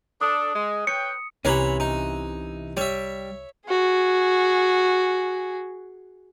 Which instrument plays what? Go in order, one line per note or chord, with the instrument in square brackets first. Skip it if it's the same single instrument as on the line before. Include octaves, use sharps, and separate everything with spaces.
[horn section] D4 A4 [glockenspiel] D#6
[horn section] G#3
[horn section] B4 C#5 G5 [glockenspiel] C#7
[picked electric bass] C2 [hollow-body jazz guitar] C3 E3 C#4 [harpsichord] C#5 A#5 B5
[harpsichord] D#4
[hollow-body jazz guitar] G3 [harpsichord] C#5 E5
[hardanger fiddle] F#4 G#4